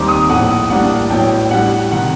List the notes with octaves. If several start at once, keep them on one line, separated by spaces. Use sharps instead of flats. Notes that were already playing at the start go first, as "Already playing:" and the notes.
Already playing: D#2 D#3 G3 C4 D#4 D6
D#6
A#1 A2 A3 F#5
A2 G3 A#3 D4 F#5
A1 A2 F#3 G5
A2 G3 D4 F#5
C3 D#3 F#5